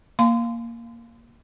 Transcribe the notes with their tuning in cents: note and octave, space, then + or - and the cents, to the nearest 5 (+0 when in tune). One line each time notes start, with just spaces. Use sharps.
A#3 +0 F5 +0 C6 -30